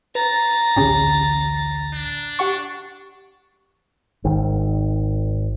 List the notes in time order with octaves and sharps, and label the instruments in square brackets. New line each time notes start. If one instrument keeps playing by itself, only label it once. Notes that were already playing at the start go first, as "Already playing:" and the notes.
[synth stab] B4 [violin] A#5 A6
[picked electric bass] A1 D2 [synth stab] C#4 G4 G#4
[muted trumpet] D4
[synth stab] G4 F#5 C#6
[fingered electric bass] G#1 D#3